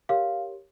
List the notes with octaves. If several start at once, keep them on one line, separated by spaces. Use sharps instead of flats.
G4 A#4 C#5 F5